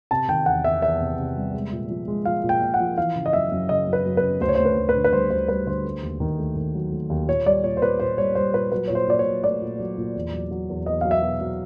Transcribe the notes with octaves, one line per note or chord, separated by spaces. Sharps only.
C3 A5
D#3 G5
E2 F#5
E2 E5
E2 E5
C3
C3
G3
G#3
A#2
F3
G#3
F3 F5
A#2
G5
A#2
F#5
F3
E3 F5
C#3
D#5
F#2 E5
F#2
C#3 D#5
F#2
B4
F#2
B4
C#3
D2 C5
C#5
D2 C5
B4
D2
B4
D3
B4
G3 C5
D2 C5
G3 B4
D3 C5
A3
D#2
D#3
A3
D#3
F#3
A3
D#2
A#2 C#5
G3 D5
A#2 C#5
C5
A#2 B4
A#2 C5
G3 C#5
G3 C5
A#2 B4
F#3 B4
A#2 C#5
C5
A#2 D5
C#5
F#3
A3 D5
A#2
F#3
A#2
E2
F#3
F#3
E2
E2 D#5
F#3 F5
E5
B2
F#3